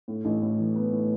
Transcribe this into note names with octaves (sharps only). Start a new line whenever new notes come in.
A2
A1
A2
E3
B3
A2